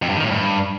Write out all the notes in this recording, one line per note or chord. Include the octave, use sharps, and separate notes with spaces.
F2
G2
D#3
A2
G2